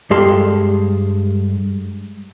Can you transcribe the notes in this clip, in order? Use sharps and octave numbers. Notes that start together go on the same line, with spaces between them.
G2 G#3 G4 A4 F5 C6